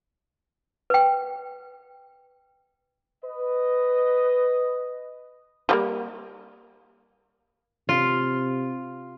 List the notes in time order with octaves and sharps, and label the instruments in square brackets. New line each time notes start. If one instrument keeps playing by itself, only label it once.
[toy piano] B4 G5
[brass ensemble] B4 D#5
[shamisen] F3 G3 A#3
[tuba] C3 [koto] F4